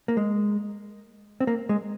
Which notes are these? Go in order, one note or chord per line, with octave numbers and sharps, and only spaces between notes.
A#3
G#3
C4
A#3
G#3